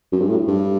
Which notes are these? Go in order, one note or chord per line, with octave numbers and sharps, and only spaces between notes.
F#2
G2
A2
G2